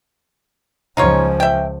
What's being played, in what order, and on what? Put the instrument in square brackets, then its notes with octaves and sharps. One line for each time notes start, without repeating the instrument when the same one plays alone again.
[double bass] C#2 F3 [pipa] D#4 F4 C#5
[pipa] E5 G5